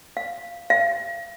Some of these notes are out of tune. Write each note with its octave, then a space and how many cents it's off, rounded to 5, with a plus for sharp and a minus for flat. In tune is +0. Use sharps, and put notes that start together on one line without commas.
F5 -10
F5 -35